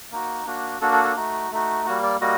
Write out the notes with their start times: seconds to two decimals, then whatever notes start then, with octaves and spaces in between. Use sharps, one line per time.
0.11 A#3 D#4 F#4
0.46 A#3 D4 F#4
0.81 A#3 D4 F#4 A4
0.92 A4
1.04 A4
1.16 A3 D#4 F#4
1.51 A3 D#4 F#4
1.86 G3 A#3 F#4
2.03 D5
2.21 G3 A#3 F#4 D#5